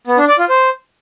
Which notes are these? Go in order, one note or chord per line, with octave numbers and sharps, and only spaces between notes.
B3
D4
D5
F4
C5